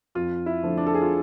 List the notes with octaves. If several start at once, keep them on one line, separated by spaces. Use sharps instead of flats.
F2 F4
E4
D3 F3 A3
D4
A4
G#4
F4